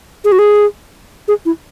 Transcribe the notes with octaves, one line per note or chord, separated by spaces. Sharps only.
G#4
F#4
G#4
G#4
E4